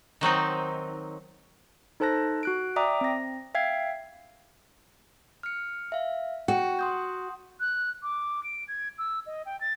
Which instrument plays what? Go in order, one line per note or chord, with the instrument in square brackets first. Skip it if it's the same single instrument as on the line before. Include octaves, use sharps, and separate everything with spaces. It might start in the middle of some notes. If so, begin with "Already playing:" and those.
[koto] D#3 F#3 C4 D#4
[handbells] D#4 A4 C5 A5 F#6 A#6
F#4 F#6 D7
D5 E5 G5 A#5 D6 D#6
C4 A#6
E5 F5 G5 G#6 C7
[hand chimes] F6 C#7
E5 F5
[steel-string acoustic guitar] F#4 [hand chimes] G5
[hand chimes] C6 D#6 G6
[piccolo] F#6
D6
D7
G#6
E6
D#5
G5
A6